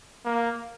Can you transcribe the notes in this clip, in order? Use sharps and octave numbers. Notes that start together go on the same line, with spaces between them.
A#3